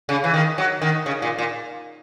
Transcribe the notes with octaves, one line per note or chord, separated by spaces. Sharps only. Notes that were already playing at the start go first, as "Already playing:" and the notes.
C#3
E3
D#3
F#3
D#3
C#3
A#2
A#2